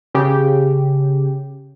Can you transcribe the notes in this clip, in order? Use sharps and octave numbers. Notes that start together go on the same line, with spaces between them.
C#3 G4